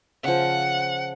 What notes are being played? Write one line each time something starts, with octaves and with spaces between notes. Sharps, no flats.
C#3 F3 F#5